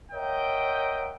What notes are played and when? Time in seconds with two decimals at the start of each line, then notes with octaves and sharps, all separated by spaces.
0.12 A#4 C#5 D#5 E5 F#5 G5